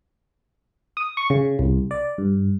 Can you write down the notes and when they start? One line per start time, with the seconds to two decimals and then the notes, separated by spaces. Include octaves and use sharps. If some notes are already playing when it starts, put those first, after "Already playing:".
0.97 D#6
1.17 C#6
1.30 C#3
1.59 C2
1.91 D5
2.18 G2